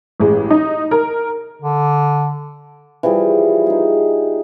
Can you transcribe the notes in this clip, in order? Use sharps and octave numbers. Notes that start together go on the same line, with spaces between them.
A1 G#3
D#4
A#4
D3
E3 F3 G3 G#4
D#4 G#4